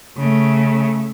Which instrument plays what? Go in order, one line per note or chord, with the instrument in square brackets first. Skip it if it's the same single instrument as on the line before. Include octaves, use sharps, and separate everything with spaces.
[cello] C#3 A3